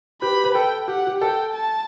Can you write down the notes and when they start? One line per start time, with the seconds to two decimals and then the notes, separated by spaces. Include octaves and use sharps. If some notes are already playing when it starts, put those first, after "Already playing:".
0.22 G4 B4 B5
0.45 B4
0.55 A4 G5
0.88 G4 F#5
1.07 G4
1.21 A4 G5
1.55 A5